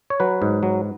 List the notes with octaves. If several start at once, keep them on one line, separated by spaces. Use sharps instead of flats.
C#5
F#3 B4
G#2
F#3